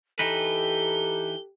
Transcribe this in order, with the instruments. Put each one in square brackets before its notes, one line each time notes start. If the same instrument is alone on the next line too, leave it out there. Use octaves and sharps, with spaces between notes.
[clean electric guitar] E3 D#4 B4 [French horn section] G4 [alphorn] A4 [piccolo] G7